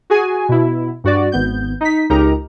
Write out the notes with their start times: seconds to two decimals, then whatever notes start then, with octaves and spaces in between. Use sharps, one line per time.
0.10 F#4 G#4 G#5
0.49 B2 E4
1.04 G2 F#4 D5
1.32 G#1 B3 G6
1.81 D#4 B6
2.10 C#2 D#4 G4 A#4 A#5